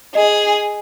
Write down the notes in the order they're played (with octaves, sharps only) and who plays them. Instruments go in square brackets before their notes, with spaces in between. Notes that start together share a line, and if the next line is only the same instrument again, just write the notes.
[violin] G#4 [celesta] D#5